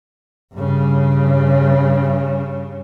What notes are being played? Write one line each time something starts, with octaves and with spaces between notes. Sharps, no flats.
G2 C#3